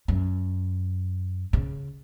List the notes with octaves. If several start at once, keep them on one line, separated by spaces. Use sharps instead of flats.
F#2
C#3